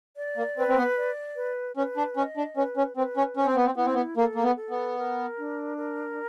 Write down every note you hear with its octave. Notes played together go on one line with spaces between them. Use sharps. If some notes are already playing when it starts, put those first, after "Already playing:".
D5
A#3
C4 B4
C4
B3
D5
B4
C#4 B4
D4
C#4 D#5
D4
C#4 B4
C#4
C4 B4
C#4
C#4 C5
C4
B3
C4
B3 E4
C4
B3
A#3 A4
A#3
B3
A4
B3
A#4
D4
A#4